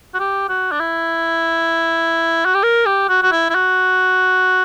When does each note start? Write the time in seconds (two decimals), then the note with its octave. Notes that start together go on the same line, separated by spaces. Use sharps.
0.14 F#4
0.20 G4
0.49 F#4
0.72 D4
0.80 E4
2.45 F#4
2.54 G4
2.63 A#4
2.86 G4
3.09 F#4
3.23 F#4
3.32 E4
3.50 E4
3.55 F#4